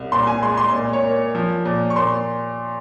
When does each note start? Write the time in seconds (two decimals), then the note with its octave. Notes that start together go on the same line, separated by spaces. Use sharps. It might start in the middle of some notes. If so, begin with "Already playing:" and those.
Already playing: C2
0.12 A#2 C6
0.27 G#5
0.43 G#3 C6
0.57 C6
0.73 A#2
0.93 C#5
1.04 A#3
1.35 F3
1.65 A#2
1.90 C#6
1.96 A#2 C6